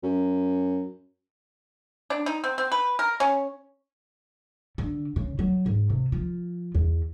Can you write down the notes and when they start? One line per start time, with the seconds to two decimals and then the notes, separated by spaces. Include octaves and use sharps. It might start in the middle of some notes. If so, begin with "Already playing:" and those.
0.03 F#2
2.10 D4
2.26 D#4
2.44 C4
2.58 C4
2.72 B4
2.99 A#4
3.20 C#4
4.78 D3
5.16 C#3
5.39 F#3
5.66 G#2
5.90 C3
6.12 F3
6.75 E2